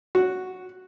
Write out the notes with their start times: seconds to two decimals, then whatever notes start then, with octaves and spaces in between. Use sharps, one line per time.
0.15 F#4